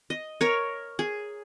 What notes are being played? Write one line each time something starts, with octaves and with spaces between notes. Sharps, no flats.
D#5
A#4 C#5
G#4